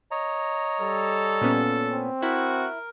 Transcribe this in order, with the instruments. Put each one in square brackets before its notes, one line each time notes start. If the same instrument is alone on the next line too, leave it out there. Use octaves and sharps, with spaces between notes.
[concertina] C#5 D#5 A#5
[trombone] G3 [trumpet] A4
[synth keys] A#2 B3 C#4
[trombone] C4
[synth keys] E4 [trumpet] F#4 [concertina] A#4